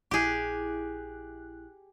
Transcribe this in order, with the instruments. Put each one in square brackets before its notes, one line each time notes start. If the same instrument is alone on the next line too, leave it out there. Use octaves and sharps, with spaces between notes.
[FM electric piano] A#1 E4 F#6 [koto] G4 G#4